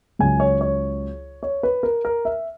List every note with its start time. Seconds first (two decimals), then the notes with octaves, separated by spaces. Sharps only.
0.19 C#2 C#3 F#3 G#5
0.40 C#5
0.61 C#5
1.43 C#5
1.63 B4
1.83 A#4
2.05 A#4
2.25 E5